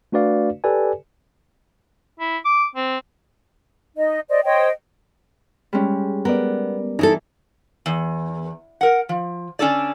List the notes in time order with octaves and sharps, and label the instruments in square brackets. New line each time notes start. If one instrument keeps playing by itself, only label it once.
[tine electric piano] A3 D4 F#4 B4 D5 F5
G4 A4 B4 D5 G#5
[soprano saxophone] E4
D6
C4
[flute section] D#4 D#5
C5 D5 D#5
C5 C#5 D#5 G5
[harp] G3 G#3 C#4
[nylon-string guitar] B3 [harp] A#4 D5
[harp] E3 [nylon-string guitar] D#4 E4 A4
[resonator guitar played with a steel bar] E2
A#4 F#5
F3
D3 C#4 D4 A4 D5